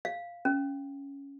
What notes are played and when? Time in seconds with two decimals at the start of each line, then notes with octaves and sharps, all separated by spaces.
0.05 F5
0.45 C#4